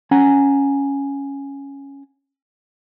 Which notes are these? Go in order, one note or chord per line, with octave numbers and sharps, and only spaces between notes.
C#4 F#5 G#5 A#5